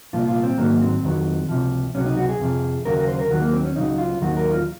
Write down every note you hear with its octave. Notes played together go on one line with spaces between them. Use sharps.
C2 A#2 F3 F4
F4
C4
G#2 D#3 F#3 A#3
C4
F2 D#3 F#3
C#2 C3 F3
C#2 C3 F#3 C#4
D#4
F#4
G#4
F2 C3 F3
D#2 C#3 F#3 A#4
A#4
C5
A#4
D#2 D#3 F#3 F#4
A#3
C4
C#4
C#2 C#3 F#3 D#4
F4
D#2 D#3 F#3 F#4
A#4
F4